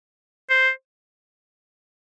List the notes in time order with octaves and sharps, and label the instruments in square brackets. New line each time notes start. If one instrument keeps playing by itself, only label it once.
[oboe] C5